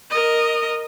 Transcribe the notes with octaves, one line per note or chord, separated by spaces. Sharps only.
A#4 D#5